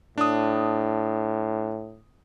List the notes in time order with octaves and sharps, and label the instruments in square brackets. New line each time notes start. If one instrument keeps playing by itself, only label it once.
[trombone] A2 [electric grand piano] D4 D#6